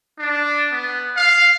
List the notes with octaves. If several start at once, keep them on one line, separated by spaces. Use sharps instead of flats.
D4
B3
F5